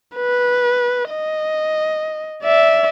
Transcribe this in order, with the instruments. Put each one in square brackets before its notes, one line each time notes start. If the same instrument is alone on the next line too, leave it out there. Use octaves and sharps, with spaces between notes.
[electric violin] B4
D#5
D5 E5